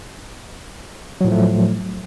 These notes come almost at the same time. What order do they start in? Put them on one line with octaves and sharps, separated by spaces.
F#3 A2 F3 A3